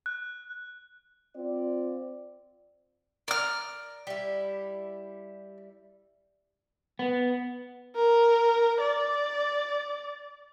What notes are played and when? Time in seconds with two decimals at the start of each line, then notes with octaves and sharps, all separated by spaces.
0.06 F#6
1.36 C4 F4 D5
3.28 A#4 D5 F6
4.07 G3 E4
6.99 B3
7.96 A#4
8.81 D5